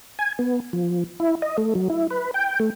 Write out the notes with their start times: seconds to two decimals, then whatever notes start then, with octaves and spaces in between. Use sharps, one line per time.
0.19 G#5
0.39 B3
0.73 F3
1.20 E4
1.42 D#5
1.58 A3
1.75 F#3
1.90 E4
2.10 B4
2.34 G5
2.60 A3